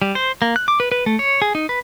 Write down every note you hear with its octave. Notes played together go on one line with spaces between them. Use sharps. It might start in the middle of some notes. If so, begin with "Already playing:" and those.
G3
C5
A#3
F#6
D6
B4
B4
A3
C#5
G#4
D#4
B4